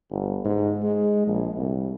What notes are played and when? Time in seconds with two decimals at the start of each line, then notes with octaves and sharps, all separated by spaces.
0.11 G1
0.45 G#2
0.83 G#3
1.27 A#1
1.57 C2